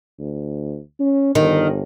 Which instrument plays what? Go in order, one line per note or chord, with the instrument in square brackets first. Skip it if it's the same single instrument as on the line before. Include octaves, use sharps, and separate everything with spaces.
[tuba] D2
C#4
[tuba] G1 [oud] D#3